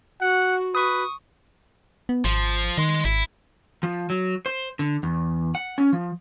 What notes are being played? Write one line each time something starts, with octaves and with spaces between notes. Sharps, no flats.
F#4 F#5
B4 C#6 D#6
B3
G#1 F3
D#3 D#5 C6
G#1 E4
F3
F#3
C5
D3
E2
F#5
C#4
F3